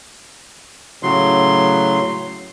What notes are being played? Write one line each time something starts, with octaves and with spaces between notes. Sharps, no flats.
A2 C#3 F#3 C6